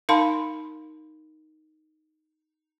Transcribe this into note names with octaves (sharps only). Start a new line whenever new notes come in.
D#4 A#4 F5 A5 B5 C6